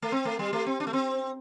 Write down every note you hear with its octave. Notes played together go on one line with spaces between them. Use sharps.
A3
C4
A3
G3
A3
C4
D4
A3
C4